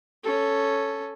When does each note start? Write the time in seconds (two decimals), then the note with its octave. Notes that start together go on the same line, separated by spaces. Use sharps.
0.23 C#4 A4